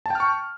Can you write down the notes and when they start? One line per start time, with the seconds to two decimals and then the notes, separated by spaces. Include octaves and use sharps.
0.06 A5
0.10 G5
0.15 F6
0.20 C#6